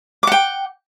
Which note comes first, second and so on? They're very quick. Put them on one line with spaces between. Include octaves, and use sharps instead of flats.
D6 F#5 G5